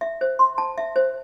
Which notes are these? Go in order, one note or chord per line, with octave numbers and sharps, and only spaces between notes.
E5
C5
C6
A5
E5
C5